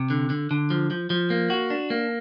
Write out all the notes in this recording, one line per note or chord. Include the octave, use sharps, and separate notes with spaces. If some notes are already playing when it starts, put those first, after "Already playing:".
Already playing: C3
D3
D3
D3
F3
F3
F3
A#3
F#4
D4
A#3